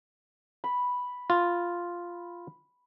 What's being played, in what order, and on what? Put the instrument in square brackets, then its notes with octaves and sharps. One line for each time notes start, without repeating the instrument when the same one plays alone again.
[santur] B5
[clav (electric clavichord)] F4